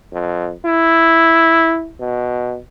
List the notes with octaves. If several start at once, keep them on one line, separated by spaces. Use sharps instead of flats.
F2
E4
B2